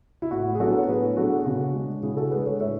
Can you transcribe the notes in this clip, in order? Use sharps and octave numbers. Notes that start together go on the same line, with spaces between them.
E4
A2 F#4
G#4
F#3 B3 D4 F#4 A4
C#5
A2 G#4 B4
F#3 B3 D4 F#4 A4
G#4
C#3 F#4
G#3 D4
C#3 E4 G#4
F#4 A4
G#3 D4 G#4 B4
A4 C#5
A2 C#5 E5